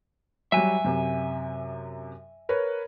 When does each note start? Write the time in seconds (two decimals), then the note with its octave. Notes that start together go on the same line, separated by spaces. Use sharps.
0.52 F#3 G3 E5 G#5
0.84 F#2 C3
2.49 A#4 B4 C#5